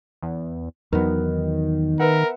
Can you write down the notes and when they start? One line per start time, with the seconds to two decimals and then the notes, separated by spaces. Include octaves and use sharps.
0.23 E2
0.93 E2 D#3 F#3 B3 A#4
1.99 A#4 B4 E5 F#5